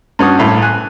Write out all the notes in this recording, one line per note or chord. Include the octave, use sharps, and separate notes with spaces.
G2 C#4 F#4 D#6
C2 A2 A3
G#5 F#6